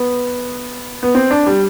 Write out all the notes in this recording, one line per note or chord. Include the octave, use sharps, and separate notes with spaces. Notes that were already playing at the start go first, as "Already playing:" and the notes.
Already playing: B3
B3
C4
D4
G3